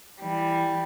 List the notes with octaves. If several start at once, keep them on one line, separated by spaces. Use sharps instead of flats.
E3 G3